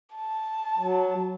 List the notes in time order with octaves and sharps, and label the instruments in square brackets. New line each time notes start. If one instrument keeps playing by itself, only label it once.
[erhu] A5
[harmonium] F#3